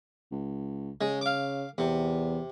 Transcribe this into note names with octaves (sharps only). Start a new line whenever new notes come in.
C#2
C#3 G#3
F5 D6
E2 C3